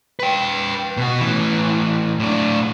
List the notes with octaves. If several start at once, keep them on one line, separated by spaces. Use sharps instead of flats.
B4 G5
B2 F#4
A2 E3
A2 D4